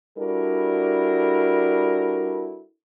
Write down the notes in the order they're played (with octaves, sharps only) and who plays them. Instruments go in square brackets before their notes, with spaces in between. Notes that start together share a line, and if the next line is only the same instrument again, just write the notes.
[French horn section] G3 D4 E4 F#4 A4 A#4